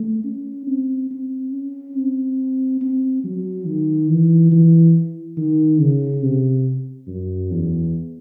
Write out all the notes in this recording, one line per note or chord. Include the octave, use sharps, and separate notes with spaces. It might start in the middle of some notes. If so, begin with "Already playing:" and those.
Already playing: A3
C#4
C4
C4
C#4
C4
C4
F#3
D#3
E3
E3
D#3
C#3
C3
F#2
E2